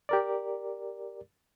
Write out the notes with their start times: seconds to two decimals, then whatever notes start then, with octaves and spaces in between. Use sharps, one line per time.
0.09 G4 A#4 D5